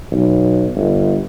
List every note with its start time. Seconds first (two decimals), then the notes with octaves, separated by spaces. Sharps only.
0.12 B1
0.76 G1